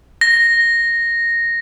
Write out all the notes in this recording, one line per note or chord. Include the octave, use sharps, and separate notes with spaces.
A#6